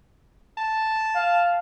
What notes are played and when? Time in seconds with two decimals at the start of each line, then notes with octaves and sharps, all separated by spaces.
0.57 A5
1.16 F5